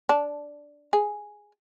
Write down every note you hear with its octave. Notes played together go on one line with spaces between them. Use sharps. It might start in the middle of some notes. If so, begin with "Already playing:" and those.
D4
G#4